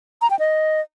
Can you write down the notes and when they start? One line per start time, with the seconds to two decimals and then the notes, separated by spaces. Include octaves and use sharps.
0.22 A#5
0.30 G5
0.39 D#5